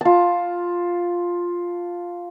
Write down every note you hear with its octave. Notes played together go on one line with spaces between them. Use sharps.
F4 A5